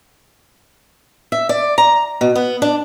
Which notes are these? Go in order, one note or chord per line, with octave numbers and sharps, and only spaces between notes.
E5
D5
A#5
B2
B3
D4